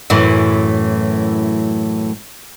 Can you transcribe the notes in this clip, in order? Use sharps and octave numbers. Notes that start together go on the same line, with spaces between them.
F#2 A2 E3